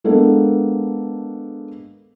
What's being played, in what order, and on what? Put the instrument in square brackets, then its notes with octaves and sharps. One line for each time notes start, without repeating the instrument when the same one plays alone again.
[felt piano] G#3 A#3 B3 D4 A4